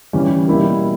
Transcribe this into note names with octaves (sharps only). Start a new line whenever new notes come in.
E3 G3 C#4
B2 G3 A#3 E4 A#4